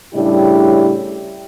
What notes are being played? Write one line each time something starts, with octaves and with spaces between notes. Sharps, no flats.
A2 C#3 G3 D4 E4 G4